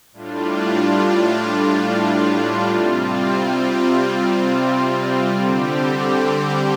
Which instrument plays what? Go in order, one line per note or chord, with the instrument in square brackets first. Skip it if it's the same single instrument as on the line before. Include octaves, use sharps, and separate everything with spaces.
[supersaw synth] A2 G3 D4 F4
C3 G3 C4 F4
D3 G3 C4 G4